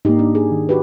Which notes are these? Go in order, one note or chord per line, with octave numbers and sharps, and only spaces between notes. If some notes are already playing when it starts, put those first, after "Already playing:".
G#2 A#3 D#4 G4
D4
G#4
D#3
F#4 G4 B4